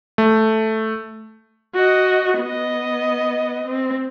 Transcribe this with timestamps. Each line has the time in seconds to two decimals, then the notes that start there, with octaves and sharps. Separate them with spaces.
0.18 A3
1.74 F#4 D#5
2.39 B3 D#5
3.67 C4